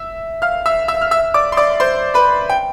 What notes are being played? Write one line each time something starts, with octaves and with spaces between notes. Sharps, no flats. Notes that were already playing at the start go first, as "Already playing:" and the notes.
Already playing: E5 E6
F5 F6
E5 E6
E5 E6
F6
E5 E6
D5 D6
C6
D5 D6
C5 C6
B4 B5
G5